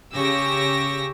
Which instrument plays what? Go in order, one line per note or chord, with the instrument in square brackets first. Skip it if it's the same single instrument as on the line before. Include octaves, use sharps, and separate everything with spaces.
[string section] C#3 G4 C#6 E6 A#6